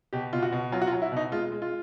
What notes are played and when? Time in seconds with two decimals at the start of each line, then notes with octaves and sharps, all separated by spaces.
0.13 B2 G4
0.33 B2 F4
0.42 F#4
0.52 B2
0.72 F#3 F4
0.82 F#4
0.87 F4
0.92 F#3
1.02 E4
1.12 B2 D#4
1.32 G#3 F4
1.52 G#3
1.62 F4